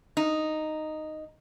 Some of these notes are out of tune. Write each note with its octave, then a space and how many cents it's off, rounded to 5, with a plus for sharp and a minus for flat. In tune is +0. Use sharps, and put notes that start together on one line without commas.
D#4 -5